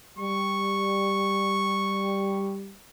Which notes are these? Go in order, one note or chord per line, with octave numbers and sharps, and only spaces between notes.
G3 C#6